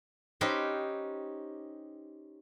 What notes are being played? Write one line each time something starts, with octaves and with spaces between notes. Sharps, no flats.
C#4 D#4 G4 B4 C5